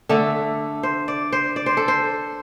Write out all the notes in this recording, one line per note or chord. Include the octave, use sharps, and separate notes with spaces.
D3 A3 D4 A4
C5
D5
C5
D5
C5
A4
C5